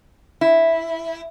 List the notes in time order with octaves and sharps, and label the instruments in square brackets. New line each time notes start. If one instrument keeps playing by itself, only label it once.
[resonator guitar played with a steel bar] E4